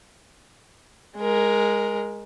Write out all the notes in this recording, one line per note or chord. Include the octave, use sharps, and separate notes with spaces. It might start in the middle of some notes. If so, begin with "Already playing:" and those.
G#3 A#4